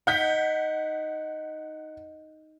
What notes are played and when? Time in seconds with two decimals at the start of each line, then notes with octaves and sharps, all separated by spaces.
0.07 D#4 F#5 G6 B6